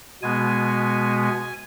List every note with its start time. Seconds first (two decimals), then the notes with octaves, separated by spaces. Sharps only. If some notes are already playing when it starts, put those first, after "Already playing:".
0.22 B2 G#3 B3 G#5
1.23 G#5